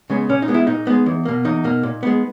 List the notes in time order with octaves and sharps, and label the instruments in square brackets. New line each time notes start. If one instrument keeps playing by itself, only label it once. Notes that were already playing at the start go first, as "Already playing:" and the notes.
[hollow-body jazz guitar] C#3 G#3 B3
A#2 C#4
D#4
G#3 B3
E4
A#2 D#4
G#3 B3
E2
B2 A#3
E2 D#4
B2 A#3
A#2
G#3 B3